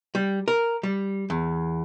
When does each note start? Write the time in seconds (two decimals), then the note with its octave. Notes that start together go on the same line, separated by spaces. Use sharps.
0.15 G3
0.48 A#4
0.83 G3
1.30 E2